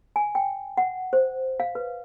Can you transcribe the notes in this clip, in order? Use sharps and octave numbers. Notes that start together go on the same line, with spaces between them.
G#5
G5
F#5
C5
F5
B4